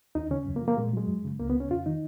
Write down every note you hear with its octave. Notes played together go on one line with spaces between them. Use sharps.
D#2 D#4
C#3 C#4
F#2
A#3
F3
A#3
A#2 G#3
F#3 G#3
F#2
C#3
C#2 A#3
B3
C#3
C#4
F2 F4
D#3 D#4